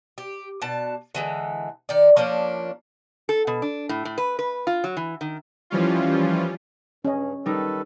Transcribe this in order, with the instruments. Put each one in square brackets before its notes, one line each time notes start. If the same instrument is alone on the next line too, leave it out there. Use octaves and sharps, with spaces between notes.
[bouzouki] G4
B2 D4 A5
D3 E3 G#3
D#3 D5
F3 A#3 C#4 D4
[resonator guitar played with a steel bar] A4
B2
D4
A2
A2
B4
B4
F4
F#3
E3
D#3
[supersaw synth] E3 F3 G3 C#4 F4
[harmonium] G2 [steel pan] C#4 D#5
[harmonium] D#3 A4 B4 [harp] G3 D#4